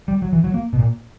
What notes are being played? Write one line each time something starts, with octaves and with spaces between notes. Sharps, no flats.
G3
F#3
E3
F#3
A#3
B2
A#2